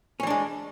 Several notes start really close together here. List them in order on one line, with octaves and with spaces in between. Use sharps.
C#4 E3 D4 G#3